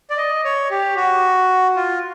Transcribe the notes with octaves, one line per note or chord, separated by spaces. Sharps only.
D5
D#5
C#5
G4
F#4
F4